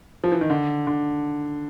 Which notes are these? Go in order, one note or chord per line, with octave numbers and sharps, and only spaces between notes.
F3
E3
D#3
D3
D3